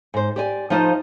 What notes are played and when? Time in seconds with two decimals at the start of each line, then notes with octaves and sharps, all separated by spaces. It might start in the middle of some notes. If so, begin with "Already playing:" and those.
0.14 G#2 C5
0.36 G4 D5 G#5
0.70 F3 A3 D#4 F4 C5